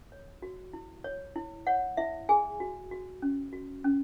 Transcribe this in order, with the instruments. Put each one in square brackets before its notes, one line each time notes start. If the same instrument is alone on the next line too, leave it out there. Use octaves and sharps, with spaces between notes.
[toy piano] C#5
F#4
E4
C#5
E4
C#5 F#5
E4 E5
G#4 G#5
F#4
F#4
C#4
F#4
C#4